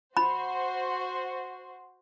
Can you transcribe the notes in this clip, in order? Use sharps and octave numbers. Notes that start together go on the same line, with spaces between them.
F#4 C5 B5